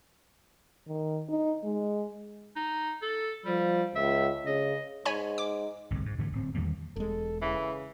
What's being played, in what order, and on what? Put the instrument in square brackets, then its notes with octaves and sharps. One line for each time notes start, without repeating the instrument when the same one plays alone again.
[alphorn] D#3
D#4
G#3
[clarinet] D#4
A4
[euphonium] F3 [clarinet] G3
[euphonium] C#2 [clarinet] E5
[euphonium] C#3 [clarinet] D#5
[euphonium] G#2 [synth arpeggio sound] C#5 G#5 B5
[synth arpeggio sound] D6
[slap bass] G1 C2 F2 A2
G#2
G#2 D3 E3 A3
D1 C4
E2 D#3 G3 A#3
[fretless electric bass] E1 G#3 [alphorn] A4
[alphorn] C#3 [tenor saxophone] E3